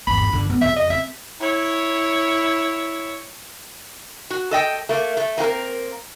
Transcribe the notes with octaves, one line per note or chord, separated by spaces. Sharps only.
G#1 E2 B5
G1 D3
B3
F2 C#3 E5
D#5
C4 E5
E4 C#5
F#4
A4 D#5 G5
A3 A#3
A3
A#3 C4 F#4 A#4